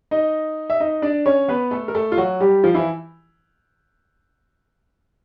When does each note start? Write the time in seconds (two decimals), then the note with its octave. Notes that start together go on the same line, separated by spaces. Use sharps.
0.11 D#4 D#5
0.70 E5
0.80 D#4 D#5
1.02 D4 D5
1.26 C#4 C#5
1.48 B3 B4
1.71 A3 A4
1.88 A#4
1.95 A3 A4
2.12 F4
2.17 F#3 F#4
2.40 G3 G4
2.64 F3 F4
2.75 E3 E4